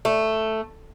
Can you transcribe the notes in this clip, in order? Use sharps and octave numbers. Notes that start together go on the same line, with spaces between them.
A3